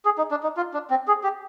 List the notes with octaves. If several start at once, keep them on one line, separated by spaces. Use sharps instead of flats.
G#4
D#4
D4
D#4
F4
D4
C4
G#4
G4